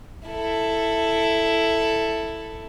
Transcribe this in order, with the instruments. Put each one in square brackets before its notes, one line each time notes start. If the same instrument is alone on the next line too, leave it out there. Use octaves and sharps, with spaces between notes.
[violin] E4 A4